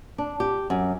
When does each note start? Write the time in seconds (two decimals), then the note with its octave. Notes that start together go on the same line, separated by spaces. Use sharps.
0.18 D4
0.40 G4
0.70 F#2